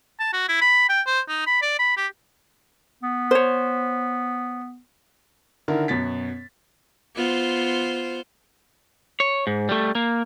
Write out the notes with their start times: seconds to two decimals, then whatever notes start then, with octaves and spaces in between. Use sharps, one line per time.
0.19 A5
0.33 F#4
0.49 E4
0.61 B5
0.89 G5
1.07 C5
1.28 D#4
1.47 B5
1.62 D5
1.79 B5
1.97 G4
3.03 B3
3.31 C5 C#5
5.68 D3 D#3 E4 A#4
5.88 F#2 B2 A6 B6
7.16 B3 F4 C5
9.20 C#5
9.47 G#2
9.69 G3 A3
9.95 A#3